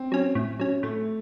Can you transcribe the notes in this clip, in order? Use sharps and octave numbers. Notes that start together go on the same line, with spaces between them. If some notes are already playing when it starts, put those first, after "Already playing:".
Already playing: C4
F#3 C#4
A2
F#3 C#4
A2 A3